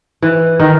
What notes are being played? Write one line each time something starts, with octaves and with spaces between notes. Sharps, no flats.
E3
D#3